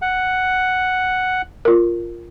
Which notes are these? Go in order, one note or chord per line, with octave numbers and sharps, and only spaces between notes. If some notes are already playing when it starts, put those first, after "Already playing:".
F#5
F4 A#4